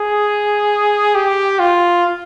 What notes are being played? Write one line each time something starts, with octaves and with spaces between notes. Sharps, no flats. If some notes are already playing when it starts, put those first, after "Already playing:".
Already playing: G#4
G4
F4